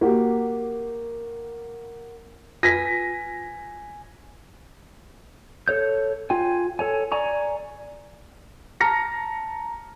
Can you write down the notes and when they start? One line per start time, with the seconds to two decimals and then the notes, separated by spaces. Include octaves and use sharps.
0.01 A#3 F#4 G4
2.63 F4 B4 G#5 A#6 B6
5.68 A4 C#5 G6
6.30 F4 G5 G#5
6.79 A4 C#5 G#5
7.12 D5 G#5 A#5 C#6
8.80 A5 A#5 F6 A#6 C#7